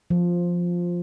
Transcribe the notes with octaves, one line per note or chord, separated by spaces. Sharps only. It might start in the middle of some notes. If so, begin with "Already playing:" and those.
F3